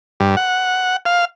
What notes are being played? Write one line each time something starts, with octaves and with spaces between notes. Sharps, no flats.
G2
F#5
F5